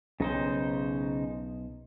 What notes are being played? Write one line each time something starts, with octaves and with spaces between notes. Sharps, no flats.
B1 C#3 D#4 C5